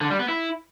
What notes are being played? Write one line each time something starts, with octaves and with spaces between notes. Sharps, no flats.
D3
G3
B3
E4